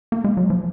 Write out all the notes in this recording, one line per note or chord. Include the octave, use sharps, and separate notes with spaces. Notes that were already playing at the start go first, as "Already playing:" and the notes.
A#3
G#3
F#3
F3